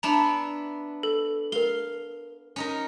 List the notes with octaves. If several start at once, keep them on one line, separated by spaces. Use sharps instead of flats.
B3 D4 E4 A5 A#5
A4
A#4 F5 G7
C#4 D#4 A#4